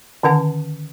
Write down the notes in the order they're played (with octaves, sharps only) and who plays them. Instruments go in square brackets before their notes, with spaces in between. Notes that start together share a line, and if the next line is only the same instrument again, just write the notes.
[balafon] D3 D#3 C#4 F#5 A5